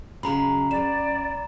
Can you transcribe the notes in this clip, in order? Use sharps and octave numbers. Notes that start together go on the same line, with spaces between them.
C#3 F#3 G#3 A#5 B5
F#2 D5 E7